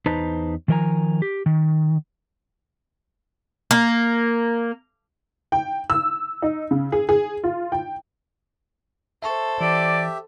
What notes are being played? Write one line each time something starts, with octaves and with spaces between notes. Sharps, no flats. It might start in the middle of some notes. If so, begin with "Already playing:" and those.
E2 D#4 B4 C5 A5 A#5
D#3 F3 A#4 D#5 G#5 A#5
G4
D#3
A#3
G5
E6
D#4
C#3
G#4
G#4
F4
G5
A4 C5 E5 A5 C#6
E3 G4 D5 E5